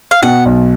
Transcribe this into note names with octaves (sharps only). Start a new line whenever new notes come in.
F5
B2 F#5
B1